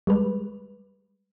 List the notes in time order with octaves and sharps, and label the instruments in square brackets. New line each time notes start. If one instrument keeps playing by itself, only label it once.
[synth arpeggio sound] G3 G#3 B4